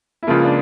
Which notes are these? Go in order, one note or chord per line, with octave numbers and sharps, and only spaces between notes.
E4
C#2 C#3 F3 A#3 F4
D4